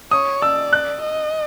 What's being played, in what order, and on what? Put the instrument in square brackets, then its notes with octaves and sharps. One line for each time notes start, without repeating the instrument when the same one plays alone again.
[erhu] C#5 [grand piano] D#6
[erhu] D5 [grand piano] E6
[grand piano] F#6
[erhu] D#5